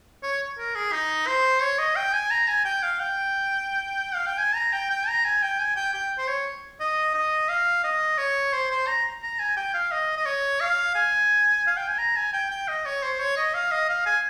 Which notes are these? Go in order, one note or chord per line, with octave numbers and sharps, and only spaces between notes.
C#5
A#4
G#4
D#4
C5
C#5
D#5
G5
G#5
A#5
G#5
G5
F5
G5
F5
G5
G#5
A#5
G5
G5
A#5
G#5
G5
G#5
G5
G5
C5
C#5
D#5
D#5
F5
D#5
C#5
C5
C5
A#5
A#5
G#5
G5
F5
D#5
D#5
C#5
F5
G#5
F5
G5
G#5
A#5
G#5
G5
G5
D#5
C#5
C5
C#5
D#5
F5
D#5
F5
G#5